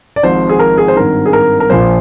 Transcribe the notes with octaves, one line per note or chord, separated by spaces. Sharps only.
D5
G#1 G#2 F3 C5
G#4
A#4
G#4
C5
G#1 G2 D#3 A#4
G#4
A#4
A#4
A#1 A#2 F3 C5